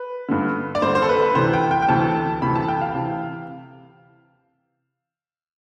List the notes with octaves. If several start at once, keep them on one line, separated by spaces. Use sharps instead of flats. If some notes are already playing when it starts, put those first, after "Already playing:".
Already playing: B4
G2 D3
D5
G2 D3 C5
C5
A4
B4
B4
D2 C3 E3 C5
G5
G5
G5
D2 C3 E3 A5
D2 C3 E3 B5
A5
G5
F5
C3 E3